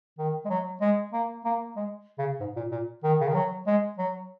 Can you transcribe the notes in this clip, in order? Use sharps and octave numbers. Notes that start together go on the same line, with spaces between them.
D#3
G#3
F#3
G#3
A#3
A#3
G#3
C#3
G#2
A#2
A#2
D#3
C#3
D#3
F#3
G#3
F#3